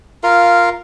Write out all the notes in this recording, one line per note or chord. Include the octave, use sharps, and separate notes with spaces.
F4 A#4 F5